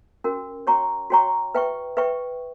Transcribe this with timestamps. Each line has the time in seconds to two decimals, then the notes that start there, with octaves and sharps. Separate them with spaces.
0.24 C#4 F#4 A#4
0.67 F#4 C#5 G5 A#5 C#6
1.10 F#4 C#5 G5 A#5 C#6
1.55 B4 E5 G5 C#6
1.97 B4 E5 G5 C#6